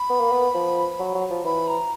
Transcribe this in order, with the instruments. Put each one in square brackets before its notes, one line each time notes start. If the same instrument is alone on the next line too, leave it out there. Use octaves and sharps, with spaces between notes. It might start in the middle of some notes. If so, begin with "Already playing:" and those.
Already playing: [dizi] B5
[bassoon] B3
A#3
B3
F3
F#3
F#3
F3
[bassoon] E3 [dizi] B5
[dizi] A#5